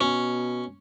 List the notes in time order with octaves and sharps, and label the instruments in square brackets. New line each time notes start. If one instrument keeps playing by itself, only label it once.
[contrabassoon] B2 [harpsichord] C#4